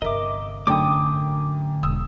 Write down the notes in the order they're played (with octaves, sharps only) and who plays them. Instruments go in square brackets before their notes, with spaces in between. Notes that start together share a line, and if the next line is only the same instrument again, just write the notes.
[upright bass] G1 C3 [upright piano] A#4 E5 [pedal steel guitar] D#5 D6
[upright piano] F#2 G5 [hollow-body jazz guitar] A2 D3 [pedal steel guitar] D6 D#6
[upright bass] E1 [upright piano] D#6 E6